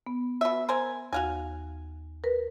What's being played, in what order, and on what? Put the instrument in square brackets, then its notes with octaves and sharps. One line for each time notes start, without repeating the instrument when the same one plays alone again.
[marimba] B3
[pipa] B2 E5
A#4 C5 G#5
[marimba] D#2 [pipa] F#4 F5 G#5
[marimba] A#4 B4